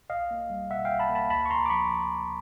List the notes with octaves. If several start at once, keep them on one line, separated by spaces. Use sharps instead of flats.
B1 D#5 F5
A#3
G3
B2 E5 F#5
B1 F5 G5
A5 B5
A#3
A5 B5
D2 A5 B5
C#6
D2 A#5 C6
D6
F3 B5 C#6